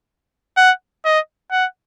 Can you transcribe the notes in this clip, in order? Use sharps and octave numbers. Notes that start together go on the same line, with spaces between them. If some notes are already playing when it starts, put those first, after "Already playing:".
F#5
D#5
F#5